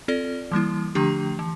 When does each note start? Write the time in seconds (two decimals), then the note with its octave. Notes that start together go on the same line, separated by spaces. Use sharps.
0.08 C4 F4 A4 D5
0.51 E3 G3 A#3 E4
0.95 D3 F3 A3 D4 G4
1.39 E3